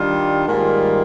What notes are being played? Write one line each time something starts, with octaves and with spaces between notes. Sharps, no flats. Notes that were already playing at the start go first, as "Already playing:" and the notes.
Already playing: D#3 G3 D4 F4
G#2 D#3 G3 A#3 F4